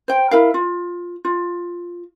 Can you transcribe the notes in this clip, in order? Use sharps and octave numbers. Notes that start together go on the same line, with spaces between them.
C5 G5
E4 A#4 F5
F4
F4